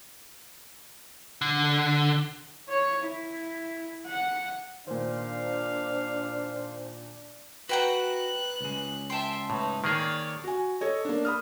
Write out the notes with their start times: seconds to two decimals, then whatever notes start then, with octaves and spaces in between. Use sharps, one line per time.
1.42 D3
2.69 C#5
3.02 E4
4.06 F#5
4.87 A#2 D#3 D4 C5 F5
7.69 F#4 B4 F#5 G5 A#5 F#6
8.61 C#2 G#3
9.10 E5 G5 A5 C6
9.50 A2 D#4 B4
9.84 D#3 A#3 G#4 C#5 D5
10.44 F#4 G#5
10.81 A4 C#5 D#5
11.05 A#3 D4
11.25 B5 D#6 F6